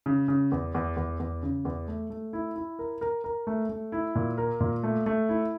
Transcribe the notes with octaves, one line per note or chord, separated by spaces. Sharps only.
C#3
C#3
E2
E2
E2
E2
C#3
E2
A3
A3
E4
E4
A#4
A#4
A#4
A3
A3
E4
A#2
A#4
A#2
A3
A3
E4